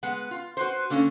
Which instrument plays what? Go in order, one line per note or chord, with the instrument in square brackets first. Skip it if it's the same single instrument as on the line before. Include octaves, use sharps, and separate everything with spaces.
[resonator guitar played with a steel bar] G#3 B3 F#5
F4
F#4 B4 C5
D3 A#3 C#4